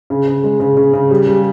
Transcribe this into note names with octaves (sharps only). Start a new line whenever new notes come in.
C#3
C#3
G#3
C#3
C#3
C#3
G3
G3